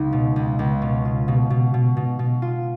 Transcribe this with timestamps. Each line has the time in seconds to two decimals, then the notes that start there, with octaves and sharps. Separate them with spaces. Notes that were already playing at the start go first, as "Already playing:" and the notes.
Already playing: C#2 D#4
0.13 B2
0.36 C#2
0.59 C#2
0.82 B2
1.05 F4
1.28 B2
1.50 B2
1.74 B2
1.97 B2
2.19 B2
2.42 F4